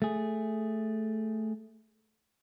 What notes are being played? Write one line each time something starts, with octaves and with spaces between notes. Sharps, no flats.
A3 G#4